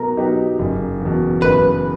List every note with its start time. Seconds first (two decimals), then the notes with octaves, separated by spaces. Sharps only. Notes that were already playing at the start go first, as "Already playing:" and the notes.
Already playing: B2 F#3 B3 D#4 A#4
0.17 F#3 B3 D#4 G4
0.59 F#1
1.00 E2
1.05 B2
1.42 F#1 B4